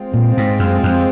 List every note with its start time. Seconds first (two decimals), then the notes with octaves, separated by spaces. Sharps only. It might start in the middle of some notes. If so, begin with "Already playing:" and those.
Already playing: G#3 C4 F4
0.14 A#2
0.37 G#2
0.59 F#2
0.83 F2